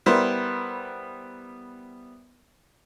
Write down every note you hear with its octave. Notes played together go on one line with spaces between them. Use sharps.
G3 B3 E4 A#4 C5